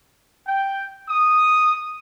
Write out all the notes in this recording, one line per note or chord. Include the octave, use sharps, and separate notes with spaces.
G5
D#6